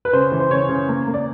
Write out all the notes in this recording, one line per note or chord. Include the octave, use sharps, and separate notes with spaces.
B4
C#3 C5
E3
C5
C#3 C#5
C#3
A#3
A#3
D5